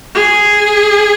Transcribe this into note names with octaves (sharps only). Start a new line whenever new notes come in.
G#4